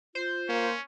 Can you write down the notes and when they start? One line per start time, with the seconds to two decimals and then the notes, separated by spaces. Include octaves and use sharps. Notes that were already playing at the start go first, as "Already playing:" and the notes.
0.15 F4 C5
0.49 A#3 C#4